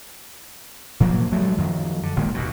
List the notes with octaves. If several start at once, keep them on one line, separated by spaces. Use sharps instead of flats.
A#2 F3 F#3 A#3
G2 F#3 G#3 A3
F#2 D#3 F3 F#3
D3
F#1 A#2 D#3 G#3
D#2 B2